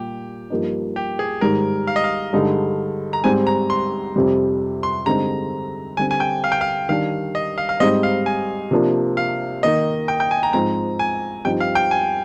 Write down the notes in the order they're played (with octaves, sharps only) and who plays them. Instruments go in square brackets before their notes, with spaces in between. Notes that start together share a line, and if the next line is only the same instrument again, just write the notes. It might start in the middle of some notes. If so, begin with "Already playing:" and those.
Already playing: [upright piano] A#2 G3 [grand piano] G4
[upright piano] G2 F3 A#3 D#4
[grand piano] G4
G#4
[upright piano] G#2 D#3 G3 [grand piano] A#4
[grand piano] F5
D#5
F5
[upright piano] G2 D3 G#3 D#4
[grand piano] A#5
[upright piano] G#2 G3 C4 [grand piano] G#5
[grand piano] A#5
C6
[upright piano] F2 C3 G3
[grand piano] C6
[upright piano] G2 D3 G#3 C4 D#4 [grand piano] A#5
[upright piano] D3 G3 C4 [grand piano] G#5
[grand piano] G#5
G5
F5
G5
F5
[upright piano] D#3 G3 D4 [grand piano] F5
[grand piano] D#5
F5
F5
[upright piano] G#2 G3 C4 D#4 [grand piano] D#5
[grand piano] F5
G#5
[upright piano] C3 F3 A#3 D4
[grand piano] F5
[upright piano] D#3 A#3 D#4 [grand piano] D#5
[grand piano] G5
G5
G#5
A#5
[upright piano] G#2 F3 C4 D#4 [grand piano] A#5
[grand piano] G#5
[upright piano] G2 F3 C4 D#4 [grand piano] G5
[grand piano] F5
G5
G#5